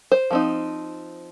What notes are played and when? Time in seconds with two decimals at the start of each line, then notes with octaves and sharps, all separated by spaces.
0.12 C5
0.31 F3 C4 D#4